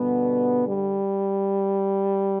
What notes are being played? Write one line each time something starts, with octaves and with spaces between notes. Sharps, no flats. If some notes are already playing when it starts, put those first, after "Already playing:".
Already playing: G2 B2 D3 G3 B3
G3